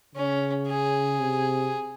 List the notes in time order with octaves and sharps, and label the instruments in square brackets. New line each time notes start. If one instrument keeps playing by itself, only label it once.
[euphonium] C#3 [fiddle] C#4
[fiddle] G#4
[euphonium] C3